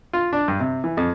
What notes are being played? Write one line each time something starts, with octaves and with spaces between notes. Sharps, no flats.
F4
D4
G2
C3
E3
F2